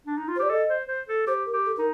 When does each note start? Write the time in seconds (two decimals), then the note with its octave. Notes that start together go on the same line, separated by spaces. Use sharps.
0.07 D4
0.17 D#4
0.28 F4
0.36 C5
0.39 G4 D5
0.50 A4 D#5
0.69 C5
0.88 C5
1.08 A4
1.27 G4 C5
1.46 A#4
1.53 G4
1.66 A4
1.76 D#4 A#4